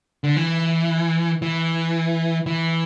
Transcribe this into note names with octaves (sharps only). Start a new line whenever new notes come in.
D3
E3
E3
E3